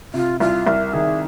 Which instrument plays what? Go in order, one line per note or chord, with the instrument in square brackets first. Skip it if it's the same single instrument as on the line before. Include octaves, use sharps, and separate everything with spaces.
[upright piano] C3 [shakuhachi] F4
[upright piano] C2 [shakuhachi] F4
[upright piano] C2 [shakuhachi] A#4
[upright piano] D#3 [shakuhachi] G#4